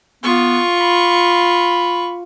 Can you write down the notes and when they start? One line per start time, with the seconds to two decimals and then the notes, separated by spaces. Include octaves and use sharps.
0.24 B3 F4 C#6
0.81 B5